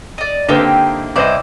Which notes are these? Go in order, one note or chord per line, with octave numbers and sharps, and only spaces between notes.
D5 D#5
D3 A#3 C4 D#4 E4 G4
C2 E4 C5 D5 D#5